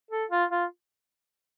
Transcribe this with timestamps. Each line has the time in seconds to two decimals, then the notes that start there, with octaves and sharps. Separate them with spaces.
0.11 A4
0.31 F4
0.51 F4